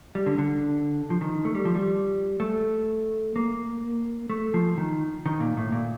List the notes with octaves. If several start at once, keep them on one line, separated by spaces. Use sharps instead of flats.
G3
D3
D3
F3
D#3
A3
G3
F3
G3
A3
A#3
A3
F3
D#3
D#3
A#2
A2
A#2